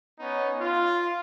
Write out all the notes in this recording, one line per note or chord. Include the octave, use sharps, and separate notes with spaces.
B3 C#4 D#4
F4